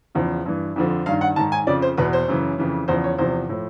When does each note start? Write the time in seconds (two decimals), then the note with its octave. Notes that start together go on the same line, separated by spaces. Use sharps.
0.15 E2 C#3 F3
0.46 G2 E3
0.76 F2 D3 F3
1.06 G2 D#3 F5
1.21 F#5
1.36 G#2 D#3 A5
1.52 G#5
1.67 F2 C#3 F3 D5
1.82 C5
1.97 E2 B2 B4
2.13 C5
2.28 F#2 C#3 E3
2.58 F2 C#3 E3
2.88 E2 C#3 F3 C5
3.04 C#5
3.18 E2 C3 F3 C5
3.49 A2 F3